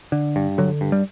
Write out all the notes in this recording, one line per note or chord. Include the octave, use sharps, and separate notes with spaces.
D3
G2
D3 F#3
G2
G3